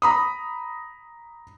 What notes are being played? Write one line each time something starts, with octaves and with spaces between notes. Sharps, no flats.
A#5 B5 D#6